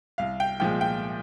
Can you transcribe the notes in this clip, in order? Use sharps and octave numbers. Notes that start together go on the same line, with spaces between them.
C2 F5
G5
A#2 F3 G#3 G5
G5